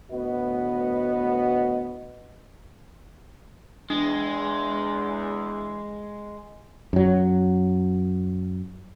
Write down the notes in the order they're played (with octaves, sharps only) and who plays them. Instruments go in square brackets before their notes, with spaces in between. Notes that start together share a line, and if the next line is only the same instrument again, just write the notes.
[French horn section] D2 A2 B3 F#4 B4 D#5
[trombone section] E2 [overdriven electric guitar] G#3 [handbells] D4
[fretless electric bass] F#2 F#3